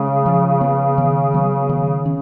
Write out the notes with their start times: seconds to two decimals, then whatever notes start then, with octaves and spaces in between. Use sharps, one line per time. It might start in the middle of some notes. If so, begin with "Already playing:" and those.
Already playing: C#3 G#3 C#4
0.26 F3
0.61 B3
0.98 D#3
1.34 F#3 B3
1.69 D#3
2.05 C#4